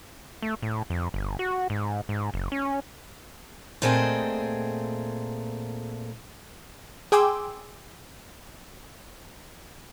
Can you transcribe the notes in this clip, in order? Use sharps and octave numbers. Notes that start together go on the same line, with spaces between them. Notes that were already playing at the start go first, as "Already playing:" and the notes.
A3
A2
F2
G1
F#4
G#2
G#2
F#1
C#4
A#2 A3 C4 G#4 D#5 G5
G#4 G5 G#5 C6 D6 E6